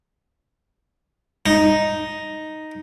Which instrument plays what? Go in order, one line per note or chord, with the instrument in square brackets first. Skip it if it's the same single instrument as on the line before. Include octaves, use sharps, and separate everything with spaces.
[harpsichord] D#4